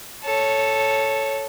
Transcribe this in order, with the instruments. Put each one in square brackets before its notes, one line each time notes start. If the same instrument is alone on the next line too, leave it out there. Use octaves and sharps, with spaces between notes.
[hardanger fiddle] A4 C#5